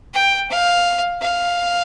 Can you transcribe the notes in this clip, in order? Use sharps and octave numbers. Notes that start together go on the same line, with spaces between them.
G5
F5
F5